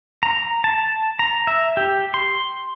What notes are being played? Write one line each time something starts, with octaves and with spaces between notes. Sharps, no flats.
A#5
A5
A#5
E5
G4
C6